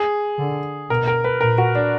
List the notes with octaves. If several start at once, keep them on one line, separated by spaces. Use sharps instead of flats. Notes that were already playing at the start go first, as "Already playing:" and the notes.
Already playing: G#4
D3
B2 A#4
A#4
B4
A#2 A#4
F#4
D4